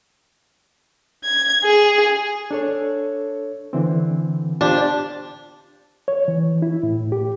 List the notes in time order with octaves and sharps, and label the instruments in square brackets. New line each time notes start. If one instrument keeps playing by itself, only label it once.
[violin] G#6
G#4
[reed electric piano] D4 A4 C#5
D3 E3 C4
[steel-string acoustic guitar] D4 [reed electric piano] F4 G4 C5
[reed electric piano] C#5
E3
E4
A2
G4